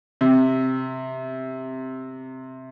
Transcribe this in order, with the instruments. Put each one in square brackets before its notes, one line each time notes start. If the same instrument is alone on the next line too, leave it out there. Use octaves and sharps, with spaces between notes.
[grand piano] C3